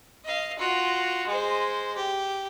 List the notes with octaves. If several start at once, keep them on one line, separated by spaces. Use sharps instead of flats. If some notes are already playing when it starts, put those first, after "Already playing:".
D#5 F5
F4 F#4
G#3 C5
G4